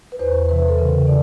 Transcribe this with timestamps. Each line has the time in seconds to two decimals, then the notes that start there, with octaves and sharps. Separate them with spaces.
0.12 B4
0.19 E2 C5
0.49 C3 E3 B4
0.69 A4
0.78 C#3 A#4
1.07 E3 D5